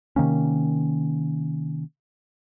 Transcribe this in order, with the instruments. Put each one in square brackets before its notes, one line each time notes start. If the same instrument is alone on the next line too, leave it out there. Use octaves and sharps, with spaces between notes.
[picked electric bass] C3 D#3 A#3 C#4